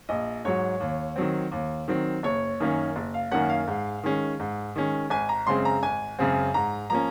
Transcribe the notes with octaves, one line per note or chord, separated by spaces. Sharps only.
A#1 D#5
G#2 F#3 C#5
D#2
D#3 F#3 C4
D#2
D#3 F#3 C4
F#1 C#5
F#2 D#3 A#3 C#4
F#1
F5
F#2 D#3 A#3 C#4 F#5
F5
G#2
D#3 G#3 C#4
G#2
D#3 G#3 C#4
G#1 G#5
A#5
F#2 C#3 G#3 C4 C6
A#5
G#1 G#5
F#2 C#3 G#3 C4
G#2 A#5
F3 A#3 C#4 A#5